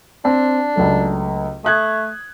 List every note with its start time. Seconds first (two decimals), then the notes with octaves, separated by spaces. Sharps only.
0.25 C4 D4
0.76 C#2 F#3 A3
1.65 A3 D#6 F#6 G#6